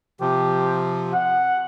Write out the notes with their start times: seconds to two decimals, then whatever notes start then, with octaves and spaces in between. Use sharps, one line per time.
0.21 C3 F3 G4
1.13 F#5